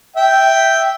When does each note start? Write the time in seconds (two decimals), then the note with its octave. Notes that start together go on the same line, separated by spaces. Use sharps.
0.16 E5 G5